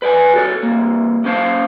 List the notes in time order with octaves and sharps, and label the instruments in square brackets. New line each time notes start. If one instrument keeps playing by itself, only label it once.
[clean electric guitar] B4 D5 F5 G#5
F#4 A4 C#5
C2 A#3
A#3 C#4 C5 F5 A5